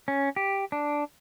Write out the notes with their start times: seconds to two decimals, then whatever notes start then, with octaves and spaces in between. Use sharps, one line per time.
0.08 C#4
0.36 G4
0.72 D4